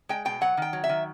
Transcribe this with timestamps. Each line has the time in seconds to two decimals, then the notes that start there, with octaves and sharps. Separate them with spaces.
0.09 G#3 G5
0.25 B2 G5
0.41 F#3 F#5
0.57 D#3 G5
0.73 F#3
0.84 E5
0.89 D#3